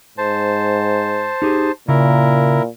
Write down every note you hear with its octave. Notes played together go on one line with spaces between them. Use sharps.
G#2 C5 A5
D#4 G4 G#4
A#2 C#3 E4 A#4